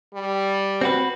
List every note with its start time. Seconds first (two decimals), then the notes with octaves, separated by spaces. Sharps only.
0.14 G3
0.81 C4 F#4 B4